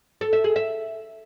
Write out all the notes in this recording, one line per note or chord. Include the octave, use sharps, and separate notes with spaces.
A4
E5
G#4
E5